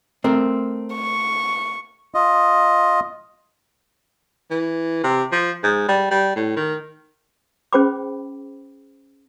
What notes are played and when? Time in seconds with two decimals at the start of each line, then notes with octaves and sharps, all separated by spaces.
0.24 A3 C4 A#4
0.95 C#6
2.15 F4 D#5
4.51 E3
5.04 C3
5.32 F3
5.63 G#2
5.89 G3
6.11 G3
6.36 A2
6.56 D#3
7.73 C#4 G#4 C5 G5 B5 D6